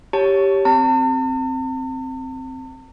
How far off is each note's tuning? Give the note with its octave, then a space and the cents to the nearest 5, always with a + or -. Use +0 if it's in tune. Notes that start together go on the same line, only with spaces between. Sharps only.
G4 +0 C#5 +0 A5 +0
C4 +0 A5 +45